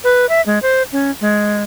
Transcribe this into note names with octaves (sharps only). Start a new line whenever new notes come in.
B4
E5
G#3
C5
C#4
G#3